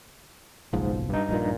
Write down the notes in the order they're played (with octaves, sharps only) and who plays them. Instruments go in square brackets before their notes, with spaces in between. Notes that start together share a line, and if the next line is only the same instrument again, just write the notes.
[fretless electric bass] F#1 B1 F3 [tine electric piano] G#2
[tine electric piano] G2 D#4
[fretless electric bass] A#1 A#2